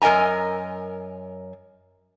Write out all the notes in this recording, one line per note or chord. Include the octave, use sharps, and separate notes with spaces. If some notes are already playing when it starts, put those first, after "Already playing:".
F#2 A#4 D#5 G#5 A#5